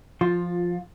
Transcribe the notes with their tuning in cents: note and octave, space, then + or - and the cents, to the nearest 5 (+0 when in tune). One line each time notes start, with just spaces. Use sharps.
F3 +0 F4 +15